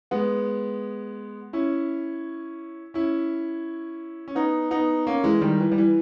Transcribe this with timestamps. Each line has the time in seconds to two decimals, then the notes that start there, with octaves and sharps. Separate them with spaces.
0.11 G#3 B3
1.53 C#4 E4
2.94 C#4 E4
4.28 C#4
4.35 B3 D#4
4.71 B3 D#4
5.07 A#3 C#4
5.24 E3 G#3
5.41 D#3 G3
5.60 E3
5.72 G3
5.78 E3